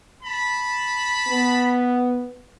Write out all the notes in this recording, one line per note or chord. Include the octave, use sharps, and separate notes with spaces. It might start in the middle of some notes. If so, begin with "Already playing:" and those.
A5 B5
B3